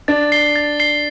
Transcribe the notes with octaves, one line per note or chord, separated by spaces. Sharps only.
D4 A6
C7 G7
A6
C7 G7